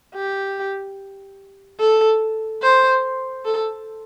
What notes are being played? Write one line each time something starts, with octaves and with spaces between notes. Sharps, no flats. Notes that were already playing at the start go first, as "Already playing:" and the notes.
G4
A4
C5
A4